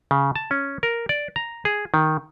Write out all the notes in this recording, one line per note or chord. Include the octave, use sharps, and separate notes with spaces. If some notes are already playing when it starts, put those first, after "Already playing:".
C#3
A5
C#4
A#4
D5
A#5
G#4
D#3